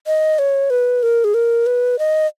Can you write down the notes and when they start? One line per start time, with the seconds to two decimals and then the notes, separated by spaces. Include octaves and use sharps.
0.07 D#5
0.39 C#5
0.70 B4
1.03 A#4
1.24 G#4
1.34 A#4
1.66 B4
1.99 D#5